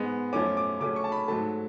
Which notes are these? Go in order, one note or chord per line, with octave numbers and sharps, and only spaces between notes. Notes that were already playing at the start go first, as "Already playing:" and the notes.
Already playing: G#2 G#3 B3
F#2 F3 A3 C#4 D6
D6
C#3 F#3 A3 C#4 D6
C#6
A5
B5
G#2 F#3 A3 A5